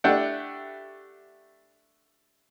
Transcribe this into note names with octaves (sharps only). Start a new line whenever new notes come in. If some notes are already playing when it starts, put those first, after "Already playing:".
A3 D4 E4 G4 F#5